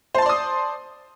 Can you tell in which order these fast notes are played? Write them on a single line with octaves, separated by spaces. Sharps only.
C5 A5 C6 D5 D#6